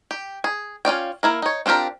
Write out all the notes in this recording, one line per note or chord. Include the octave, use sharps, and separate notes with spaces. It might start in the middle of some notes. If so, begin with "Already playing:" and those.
G4
G#4
C#4 F4 D5 G5
A#3 E4 A#4
D#4 C#5
C4 D4 F4 G4 A#4